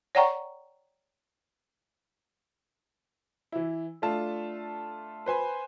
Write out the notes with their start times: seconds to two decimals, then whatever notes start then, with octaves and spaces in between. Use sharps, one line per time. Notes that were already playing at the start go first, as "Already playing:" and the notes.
0.15 C#5 D5 F#5 G5 A#5 C#6
3.52 E3 E4
4.02 A3 D4 F4 A5
5.26 B4 C5 G#5 B5